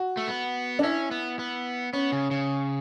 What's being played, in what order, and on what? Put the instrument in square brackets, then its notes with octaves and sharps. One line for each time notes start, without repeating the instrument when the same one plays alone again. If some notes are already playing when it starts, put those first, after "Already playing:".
Already playing: [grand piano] F#4
[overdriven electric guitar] A3
B3
[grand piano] D4
[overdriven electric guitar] C#4 [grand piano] E4
[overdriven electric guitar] B3
B3
[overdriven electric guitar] B3 [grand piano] C#4
[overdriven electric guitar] C#3
C#3